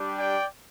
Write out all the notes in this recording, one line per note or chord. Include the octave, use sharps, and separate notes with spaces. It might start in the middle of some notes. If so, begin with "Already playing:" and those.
Already playing: G3 D4 G4
D5 G5